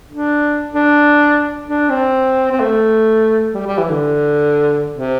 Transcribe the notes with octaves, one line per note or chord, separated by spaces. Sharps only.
D4
D4
D4
C4
C4
A3
G3
G3
E3
D3
C3